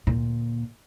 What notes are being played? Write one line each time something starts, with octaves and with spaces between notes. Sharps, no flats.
D2 A#2